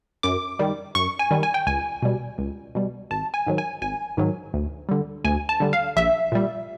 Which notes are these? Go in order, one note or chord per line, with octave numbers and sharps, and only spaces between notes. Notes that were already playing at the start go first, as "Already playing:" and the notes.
F#2 D6
D#3 G3
F#2 C#6
G#5
D#3 G3
G#5
G5
C#2 G#5
B2 G3
C#2
B2 G3
G#1 A5
G#5
G#2 D#3 F#3
G#5
G#1 G#5
G#2 D#3 F#3
D2
D3 G3
D2 G#5
A5
D3 G3
F5
A#1 E5
A#2 G3